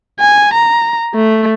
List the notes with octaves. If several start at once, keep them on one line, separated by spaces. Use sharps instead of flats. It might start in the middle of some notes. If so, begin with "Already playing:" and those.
G#5
A#5
A3